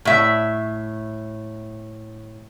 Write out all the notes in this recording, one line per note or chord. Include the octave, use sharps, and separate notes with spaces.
A2 E5